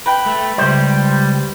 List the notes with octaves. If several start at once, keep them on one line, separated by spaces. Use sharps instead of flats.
B4 G5
A3
C#2 G3 C5